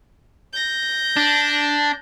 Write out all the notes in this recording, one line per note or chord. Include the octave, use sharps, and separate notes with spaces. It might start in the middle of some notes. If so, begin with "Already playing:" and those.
G6 A#6
D4